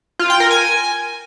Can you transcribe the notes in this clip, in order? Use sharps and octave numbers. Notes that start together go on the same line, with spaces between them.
F4
G5
A#4
G#5